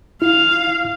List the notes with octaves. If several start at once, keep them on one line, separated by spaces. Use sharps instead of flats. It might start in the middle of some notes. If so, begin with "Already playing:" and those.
E4 F5